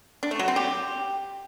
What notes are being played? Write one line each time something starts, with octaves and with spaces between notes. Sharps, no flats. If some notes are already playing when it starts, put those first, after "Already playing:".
D4
A3
F#3
C4
G4